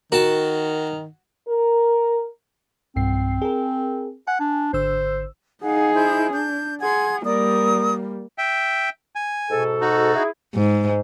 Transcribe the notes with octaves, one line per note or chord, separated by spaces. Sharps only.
D#3 F#4 A#4 A5
A#4
B1 G2 C4 C7
G#4 A#4
F#5 G#5
D4
G#1 D3 C5 E6
D#4 G#4 F5 F#5
E4 C5 G6
D4 G6
G#4 F#5 C6 G#6
G3 A#3 A#4 D5 D#6
E5 G5
G#5
G#2 B2 A4
D#4 F#4
E4 G#4
G#2